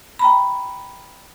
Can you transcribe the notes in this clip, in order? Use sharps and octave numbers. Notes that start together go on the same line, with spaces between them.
G5 A#5 B5